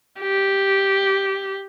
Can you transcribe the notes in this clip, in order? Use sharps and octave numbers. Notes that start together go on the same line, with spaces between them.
G4